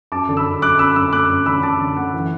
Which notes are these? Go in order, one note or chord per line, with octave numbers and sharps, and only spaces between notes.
F#2 A5 D6
D3
B5 E6
F#2
F#2 D6 F#6
F#2 B5 E6
F#2 B5 E6
A3 D6 F#6
F#2
D3 B5 E6
D3 A5 D6
D3
A3 F#5
E3